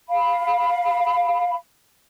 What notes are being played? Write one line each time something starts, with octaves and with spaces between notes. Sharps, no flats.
F5 B5